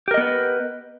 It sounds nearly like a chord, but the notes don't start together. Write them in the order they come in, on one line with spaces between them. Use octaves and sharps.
G4 A#4 D#5 B3 B4